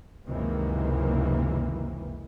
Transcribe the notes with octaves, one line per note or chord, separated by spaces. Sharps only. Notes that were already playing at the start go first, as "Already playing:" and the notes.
C#2 F#2 C3 D#3 E3 A#3